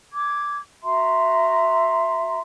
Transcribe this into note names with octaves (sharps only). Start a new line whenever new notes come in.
D6 G#6
F#4 E5 A#5 C6